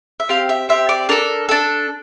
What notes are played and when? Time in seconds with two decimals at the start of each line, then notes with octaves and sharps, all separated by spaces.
0.20 E5
0.29 C4 G4 F5
0.49 E5
0.69 C4 G4 E5
0.89 D5
1.09 D4 A4 A#4
1.49 D4 A4